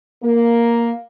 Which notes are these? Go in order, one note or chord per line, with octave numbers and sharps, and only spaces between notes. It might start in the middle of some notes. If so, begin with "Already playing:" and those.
A#3